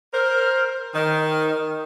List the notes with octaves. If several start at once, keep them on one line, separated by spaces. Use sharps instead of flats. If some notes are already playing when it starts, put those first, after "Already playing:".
A#4 C5
D#3